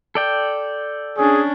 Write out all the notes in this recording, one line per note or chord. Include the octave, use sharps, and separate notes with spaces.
A4 D5 G5
C#4 D4 G#4